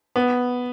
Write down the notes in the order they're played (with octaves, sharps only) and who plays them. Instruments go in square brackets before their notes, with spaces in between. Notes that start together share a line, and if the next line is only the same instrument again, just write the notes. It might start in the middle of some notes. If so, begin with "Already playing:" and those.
[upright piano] B3